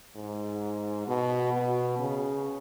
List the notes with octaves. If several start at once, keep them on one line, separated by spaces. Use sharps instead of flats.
G#2
B2
B2
C#3